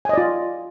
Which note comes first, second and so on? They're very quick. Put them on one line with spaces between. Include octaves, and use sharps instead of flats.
G#5 D#5 D5 F4